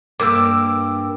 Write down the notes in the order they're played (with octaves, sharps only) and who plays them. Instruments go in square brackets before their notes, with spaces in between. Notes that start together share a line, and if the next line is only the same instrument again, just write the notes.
[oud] G2 A#3 [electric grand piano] D6 E6